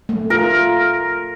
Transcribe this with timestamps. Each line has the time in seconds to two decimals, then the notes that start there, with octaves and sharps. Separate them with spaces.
0.09 A3
0.30 F4 A#4